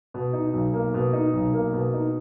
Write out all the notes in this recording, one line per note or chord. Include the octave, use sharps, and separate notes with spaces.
B2
D#4
B1
A#3
B2
D#4
B1
A#3
B2
D#4